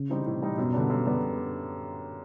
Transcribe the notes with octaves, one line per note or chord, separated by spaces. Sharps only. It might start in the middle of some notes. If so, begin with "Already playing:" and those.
Already playing: C#3
E3 G3 C4 D#4
A2 C3
E3 G3 C4 D#4
F#2 B2
D3 G3 B3 D4
F#2
D3 G3 B3 D4